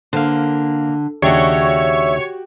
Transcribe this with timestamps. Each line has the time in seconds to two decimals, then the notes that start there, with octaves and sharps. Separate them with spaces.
0.13 D3 A#3 C5 F5
1.22 D#2 C#3 D4 F#4 G4 C#5 E5